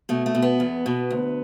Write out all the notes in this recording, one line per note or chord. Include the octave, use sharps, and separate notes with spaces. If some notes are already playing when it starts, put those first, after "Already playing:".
B2 A3
A3
B2
B3
E2
B2
D2